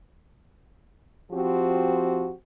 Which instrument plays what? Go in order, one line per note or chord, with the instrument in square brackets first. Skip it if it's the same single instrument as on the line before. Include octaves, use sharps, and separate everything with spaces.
[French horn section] F3 C4 F#4 G4